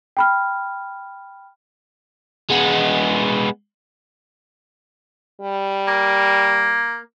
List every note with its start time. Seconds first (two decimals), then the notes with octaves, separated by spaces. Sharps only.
0.17 G5 B5 F6
2.50 G#3 B3
5.41 G3
5.88 A#3